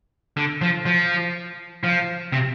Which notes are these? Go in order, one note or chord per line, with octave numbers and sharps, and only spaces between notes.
D3
F3
F3
F3
C3